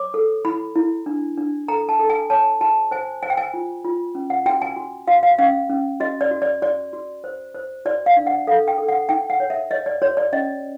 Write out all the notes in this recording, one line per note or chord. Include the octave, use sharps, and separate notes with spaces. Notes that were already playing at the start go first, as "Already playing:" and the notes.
Already playing: C#5 D6
A4
E4 B5
E4
D4
D4
A4 A#5
A5
A4
G#5
C#5 A5
F#4 A5
C5 G#5
C5 G#5
G5
G#5
F4
F4
C#4
F#5
F#4 G5
G#5
F#4
F#4 F5
F5
C#4 F5
C#4
F#4 D#5
D5
F#4
D5
F#4 D5
F#4
C5
C5
F#4 D5
F5
D4
F#5
A4 F5
G5
A4
F#5
D#4 G5
F#5
C#5
E5
C#5 D#5
D5
F#4 C#5
D5
C#4 D#5